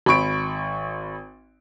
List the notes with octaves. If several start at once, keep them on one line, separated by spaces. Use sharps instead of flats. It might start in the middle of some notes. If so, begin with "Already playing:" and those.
G#1 B5 C#6 D7